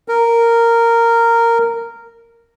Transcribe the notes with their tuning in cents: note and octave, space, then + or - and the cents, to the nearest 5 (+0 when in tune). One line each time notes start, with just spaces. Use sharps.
A#4 -10